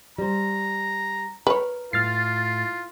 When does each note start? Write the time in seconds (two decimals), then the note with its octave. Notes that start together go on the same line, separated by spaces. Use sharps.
0.18 G3 C5 A#5
1.47 A#4 B4 C#5
1.93 A2 F4 F6 A6 C7